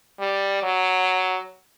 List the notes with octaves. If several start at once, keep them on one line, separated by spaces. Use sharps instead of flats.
G3
F#3